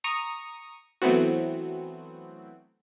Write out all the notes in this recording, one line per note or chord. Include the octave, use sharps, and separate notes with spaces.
A#5 C#6 D#6
E3 F#3 A3 B3 C4 F#4